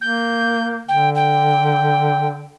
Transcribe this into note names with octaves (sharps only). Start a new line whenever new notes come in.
A#3 G6
D3 G5
G5